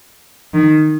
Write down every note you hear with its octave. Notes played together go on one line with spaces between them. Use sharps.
D#3